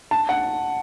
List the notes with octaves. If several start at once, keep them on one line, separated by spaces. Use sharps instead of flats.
A5
F#5